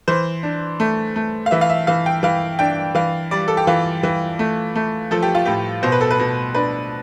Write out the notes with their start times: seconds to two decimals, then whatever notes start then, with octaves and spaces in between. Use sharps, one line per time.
0.08 E3 C5
0.43 D4
0.80 A3
1.16 A3
1.46 F5
1.51 E3 E5
1.61 F5
1.69 E5
1.87 E3 F5
2.06 G5
2.23 E3 F5
2.59 D4 G5
2.95 E3 F5
3.31 G3 D5
3.48 A4
3.57 G4
3.67 E3 F4
4.03 E3
4.39 A3
4.75 A3
5.11 F3 A4
5.22 G4
5.35 F4
5.45 A2 G4
5.83 B2 C5
5.92 B4
6.01 A4
6.11 B4
6.19 B2
6.55 D4 B4